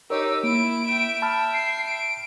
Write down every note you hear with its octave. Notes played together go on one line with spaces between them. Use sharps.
D#4 G4 A#4 C#5 E6
A#3 E4 D7
E5 G5
A5 B5 F6
C7
D7